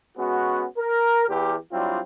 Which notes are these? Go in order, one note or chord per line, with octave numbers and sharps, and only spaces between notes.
G#3 B3 C#4 F#4
A#4
E2 G4
F#3 G3 C4 D4 E4 F4